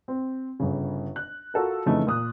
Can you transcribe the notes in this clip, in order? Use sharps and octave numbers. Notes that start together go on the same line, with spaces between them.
C4
G1 C#3
F#6
F4 F#4 A4 A#4
F2 C#3 E3 A3 D#4
A#2 D#6 F#6